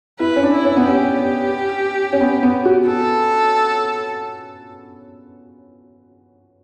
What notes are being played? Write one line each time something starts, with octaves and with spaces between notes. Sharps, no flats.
E4 B4
C#4
D4
E4
C#4
B3
C#4 G4
C#4
B3
B3
F#4
A4